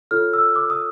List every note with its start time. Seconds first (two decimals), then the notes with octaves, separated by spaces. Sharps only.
0.11 F4 A4 C#5 F6
0.33 E6
0.56 D6
0.70 D#6